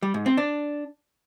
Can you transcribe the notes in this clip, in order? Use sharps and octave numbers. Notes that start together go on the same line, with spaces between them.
G3
G#2
C4
D4